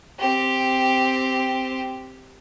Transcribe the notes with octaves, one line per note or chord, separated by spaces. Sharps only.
C4 G4